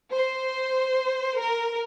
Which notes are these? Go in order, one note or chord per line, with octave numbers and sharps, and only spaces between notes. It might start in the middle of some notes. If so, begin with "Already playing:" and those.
C5
A#4